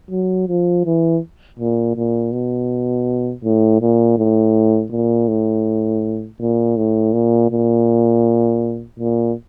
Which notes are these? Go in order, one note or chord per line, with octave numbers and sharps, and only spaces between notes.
F#3
F3
E3
A#2
A#2
B2
A2
A#2
A2
A#2
A2
A#2
A2
A#2
A#2
A#2